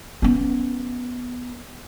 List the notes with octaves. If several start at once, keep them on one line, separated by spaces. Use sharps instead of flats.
B3 C#4